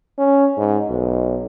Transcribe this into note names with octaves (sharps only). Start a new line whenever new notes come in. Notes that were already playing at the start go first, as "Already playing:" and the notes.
C#4
G#2
B1